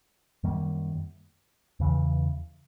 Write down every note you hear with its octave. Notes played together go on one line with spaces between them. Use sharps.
F#2 D#3 G3 A#3
E2 C#3 E3